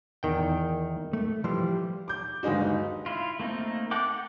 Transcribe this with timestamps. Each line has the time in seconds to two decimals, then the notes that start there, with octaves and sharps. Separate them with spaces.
0.23 E2 D#3 G5
1.13 A3
1.44 E3 F3 G3 C5
2.08 D6 G6
2.43 G1 D#2 G#3 D#4 F#4
3.06 E4 F4
3.40 A3 A#3 C4 D#4
3.91 A4 F#5 G5 D6
4.08 F#5